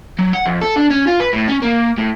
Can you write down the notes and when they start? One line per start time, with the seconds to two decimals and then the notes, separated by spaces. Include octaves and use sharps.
0.19 F#3
0.33 F#5
0.46 F2
0.61 A4
0.76 D4
0.90 C#4
1.07 F4
1.20 B4
1.33 A2
1.48 C#4
1.62 A#3
1.98 A2